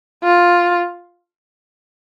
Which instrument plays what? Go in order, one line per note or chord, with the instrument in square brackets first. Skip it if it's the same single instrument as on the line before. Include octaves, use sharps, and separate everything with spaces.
[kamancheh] F4